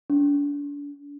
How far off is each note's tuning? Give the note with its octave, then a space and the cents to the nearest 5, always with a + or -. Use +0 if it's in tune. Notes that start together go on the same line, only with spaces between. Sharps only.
D4 -35